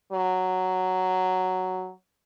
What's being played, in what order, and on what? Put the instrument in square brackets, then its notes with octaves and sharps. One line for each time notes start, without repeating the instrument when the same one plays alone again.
[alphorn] F#3